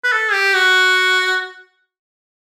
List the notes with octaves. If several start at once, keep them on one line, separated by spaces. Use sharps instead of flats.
B4
A4
G4
F#4